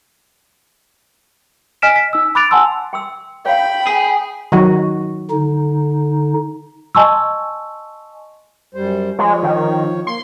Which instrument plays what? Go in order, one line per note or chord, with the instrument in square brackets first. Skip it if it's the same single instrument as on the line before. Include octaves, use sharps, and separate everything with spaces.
[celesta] D#5 G#5 F6 B6 D7 E7
B6
D#4 E6
B5 D6 F#6 A6 D7 F7
F#5 G#5 A5 C6 E6
[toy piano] G5 C6 E6
[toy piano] C#5 F5 [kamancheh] G5 B5
[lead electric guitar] G#4
[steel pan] D#3 F#3 F#4
[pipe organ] D3 D#4
[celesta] D#5 G#5 A5 C6 C#6 E6
[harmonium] F#2 G3 C5
[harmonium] F3 C#5 [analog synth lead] G#3
[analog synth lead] D#3
[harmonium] A#3 [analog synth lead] C6